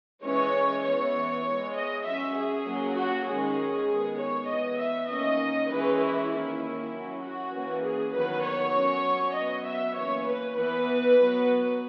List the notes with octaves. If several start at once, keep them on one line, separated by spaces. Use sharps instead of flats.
E3 G#3 C#4 C#5
E3 B3 C#5
E3 G#3 B3
D#5
F#3 C#4 E5
G#4
F#3 A#3 C#4
F#4
D#3 G#3 C#4 G#4
D#3 G#3 B3
C#5
E3 B3 D#5
E5
D#3 A#3 C#4 D#5
E3 G#3 C#4 B4
E4
D#3 A#3 C#4 E4
F#3 C#4
F#4
E3 A#3 C#4
G#4
D#3 F#3 B3 B4
C#5
F#3 C#4
F#3 B3 D#5
E5
E3 A#3 C#4 C#5
B4
E3 B3 B4
F#3 B3